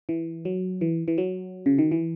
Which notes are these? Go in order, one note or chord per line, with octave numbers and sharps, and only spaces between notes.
E3
F#3
E3
E3
F#3
C#3
D#3
E3